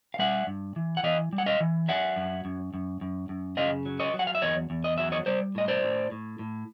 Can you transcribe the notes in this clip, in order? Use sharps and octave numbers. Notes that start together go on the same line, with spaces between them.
F5
G3 E5 F#5
G2
E3
F#5
E3 D#5 F5
G3
F#5
D#5 F5
E3
F#3 E5 F#5
F#2
F#2
F#2
F#2
F#2
C#3 D#5 F5
F#3
C#5 D#5
F#3
F#5
F5
E5
E2 C#5 D#5
E2
D#5
F#3 E5
C#5 D#5
G3 C5 D5
A2 D#5
C5 D5
A2
A2
A2